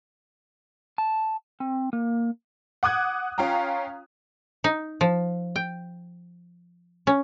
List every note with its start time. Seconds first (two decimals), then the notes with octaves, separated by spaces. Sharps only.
0.98 A5
1.60 C4
1.93 A#3
2.83 F#5 D6 D#6 F#6 G#6
3.38 C#4 F4 F5 G5 A#5
4.64 D#4
5.01 F3
5.56 G5
7.07 C#4